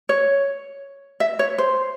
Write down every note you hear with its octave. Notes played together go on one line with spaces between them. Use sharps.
C#5
E5
C#5
C5